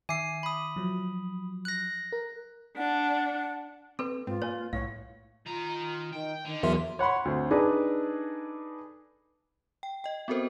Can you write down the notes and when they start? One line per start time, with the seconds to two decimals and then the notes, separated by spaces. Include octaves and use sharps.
0.09 D#3 E5 G#5 D6 C7
0.43 B5 D#6
0.76 F3 F#3
1.65 F#6 A#6
2.12 A#4
2.77 D4 F#5
3.99 C4 A4 B4 C6
4.27 G#2 C4 F4
4.42 A#3 B4 C#5 G#5
4.73 C2 A2 C#5 F5 F#5
5.46 D#3 F4 A#5
6.13 D#3 G5
6.46 D3 D#3
6.63 E2 F#3 A#4 E5 C6
6.99 C#5 F#5 B5 C6
7.25 D2 C4
7.51 D4 D#4 G#4 A4 B4 D5
9.83 G5
10.04 D#5 G5
10.28 B3 C4 F#4 A4 A#4 C5